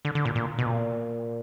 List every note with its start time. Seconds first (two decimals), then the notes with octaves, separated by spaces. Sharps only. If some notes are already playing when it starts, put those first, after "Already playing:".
0.05 D3
0.15 D3
0.25 A#2
0.35 A#2
0.59 B2
0.66 A#2